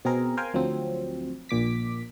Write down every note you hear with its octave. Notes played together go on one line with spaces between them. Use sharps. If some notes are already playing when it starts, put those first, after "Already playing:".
B2 C4 G#4 A#4
A#4 C5 F5 G5 G#5
D2 F3 F#3 C4
A#1 A#2 D6 B6